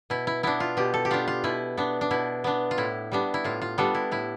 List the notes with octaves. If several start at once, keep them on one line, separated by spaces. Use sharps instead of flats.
B2 E4
E4
B3 D4 E4
F4
B2 G4
A4
G4
B3 D4 F4
F4
B2 E4
B3 D4
D4
B2 E4
B3 D4
F4
A2 E4
G3 B3 D4
E4
A2 F4
F4
G3 B3 D4 A4
E4
A2 E4